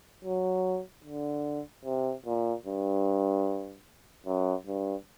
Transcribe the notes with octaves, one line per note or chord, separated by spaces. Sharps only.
F#3
D3
C3
A#2
G2
F#2
G2